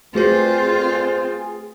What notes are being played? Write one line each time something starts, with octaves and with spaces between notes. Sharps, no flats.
A3 C4 F4 F#4 G#4 B4 C5